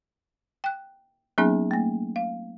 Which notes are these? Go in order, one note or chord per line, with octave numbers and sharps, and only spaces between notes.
G5 F#6
F#3 A#3 B3 C#4 D#4 G#4
A3 A#3
F5